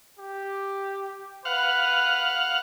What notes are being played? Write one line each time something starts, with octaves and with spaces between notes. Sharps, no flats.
G4
B4 F5 F#5